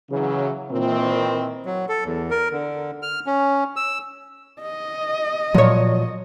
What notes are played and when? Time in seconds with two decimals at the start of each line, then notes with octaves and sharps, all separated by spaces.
0.10 C#3 E3 F#3
0.71 A#2 D#3 E3 C4
1.65 F#3
1.89 A4
2.05 E2
2.31 A#4
2.52 D3
3.02 F6
3.26 C#4
3.76 E6
4.62 D#5
5.54 A#2 F3 F#3 C#5